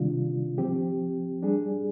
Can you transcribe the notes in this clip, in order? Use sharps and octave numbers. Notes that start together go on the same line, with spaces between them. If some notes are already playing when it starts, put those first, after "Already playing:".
Already playing: C3 D#3 G3 D4 F4
F3 C4 G4
G3 D4 G#4